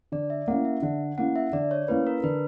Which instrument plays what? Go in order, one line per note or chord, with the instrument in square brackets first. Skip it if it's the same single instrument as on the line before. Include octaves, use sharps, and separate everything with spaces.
[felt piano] D3 [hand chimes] D5
[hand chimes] E5
[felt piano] A#3 C#4 E4 [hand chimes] F#5
[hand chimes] E5
[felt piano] D3 [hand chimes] F#5
[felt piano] A#3 C#4 E4 [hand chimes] F#5
[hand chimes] E5
[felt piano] D3 [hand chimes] D5
[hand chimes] C#5
[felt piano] A#3 C#4 E4 [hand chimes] B4
[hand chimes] A#4
[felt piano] D3 [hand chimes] B4